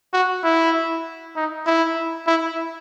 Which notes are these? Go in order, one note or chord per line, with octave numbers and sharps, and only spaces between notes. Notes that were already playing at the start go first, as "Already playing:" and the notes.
F#4
E4
D#4
E4
E4